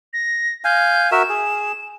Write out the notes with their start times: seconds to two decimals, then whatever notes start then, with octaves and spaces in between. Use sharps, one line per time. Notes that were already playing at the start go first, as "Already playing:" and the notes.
0.13 A#6
0.64 F5 G#5 G6
1.12 F#4 A#4 E5 E7
1.29 G#4